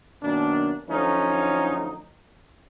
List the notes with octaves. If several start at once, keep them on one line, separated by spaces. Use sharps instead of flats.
F#2 B2 D#3 A#3 D4
F#2 D3 F3 A3 C#4 D#4